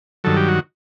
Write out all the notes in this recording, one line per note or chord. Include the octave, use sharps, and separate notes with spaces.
G2 D#3 F#3 A4
G4
F#4